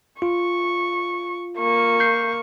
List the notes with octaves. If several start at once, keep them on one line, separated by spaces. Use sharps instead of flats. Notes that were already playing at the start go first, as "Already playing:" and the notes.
F4 C#6
A#3 C#6
G6 C7